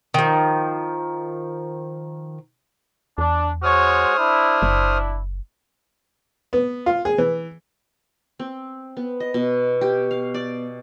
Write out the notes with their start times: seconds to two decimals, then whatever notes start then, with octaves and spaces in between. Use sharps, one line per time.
0.14 D#3 F3
3.18 E2 D4
3.63 G#3 F#4 C5 C#5 D#6 F6
4.17 D4 E4
4.62 F#1
6.53 B3
6.86 F4
7.05 G#4
7.18 E3
8.39 C4
8.97 B3
9.20 D#5
9.34 B2
9.81 G4
10.11 F5
10.34 D5